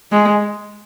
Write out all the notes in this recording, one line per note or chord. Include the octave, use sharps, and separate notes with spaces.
G#3